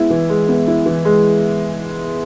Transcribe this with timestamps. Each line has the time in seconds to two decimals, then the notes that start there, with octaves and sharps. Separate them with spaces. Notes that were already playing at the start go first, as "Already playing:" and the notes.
Already playing: G#3 B3 E4
0.10 E3
0.30 G#3
0.48 B3
0.68 E4
0.86 E3
1.05 G#3